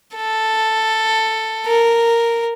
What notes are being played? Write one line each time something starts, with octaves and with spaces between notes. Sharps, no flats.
A4
A#4